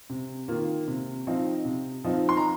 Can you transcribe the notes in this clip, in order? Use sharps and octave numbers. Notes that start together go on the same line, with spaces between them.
C3
D#3 A#3 F4
C3
F3 C4 D#4
C3
F3 C4 D#4
C6
A#5